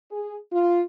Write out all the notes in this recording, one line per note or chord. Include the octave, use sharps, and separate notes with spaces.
G#4
F4